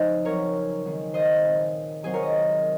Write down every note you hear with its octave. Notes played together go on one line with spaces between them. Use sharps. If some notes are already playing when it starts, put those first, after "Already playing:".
Already playing: C#3 F3 C4 D#4 C5 D#5
C#3 F#3 C4 A#4 C#5
D#3 G#3 C4
C5 D#5
A#2 G#3 C4
C3 D#3 F#3 C4 G#4 C5
A#4 C#5
D#5